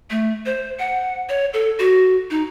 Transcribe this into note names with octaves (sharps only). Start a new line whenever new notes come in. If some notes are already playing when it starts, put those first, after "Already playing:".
A3
C5
F#5
C#5
A4
F#4
D#4